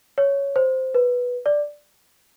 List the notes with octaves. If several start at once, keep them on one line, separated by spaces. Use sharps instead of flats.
C#5
C5
B4
D5